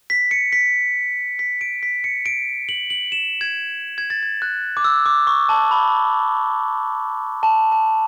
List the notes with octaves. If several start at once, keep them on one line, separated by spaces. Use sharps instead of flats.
B6
C#7
B6
B6
D7
B6
C#7
D7
F#7
F#7
E7
G#6
G#6
A6
G#6
F#6
D6
E6
D6
C#6
A5
B5
A5
A5